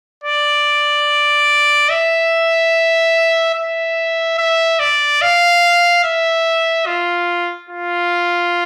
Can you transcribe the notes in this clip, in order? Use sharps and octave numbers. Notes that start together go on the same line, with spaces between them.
D5
E5
E5
E5
D5
F5
E5
F4
F4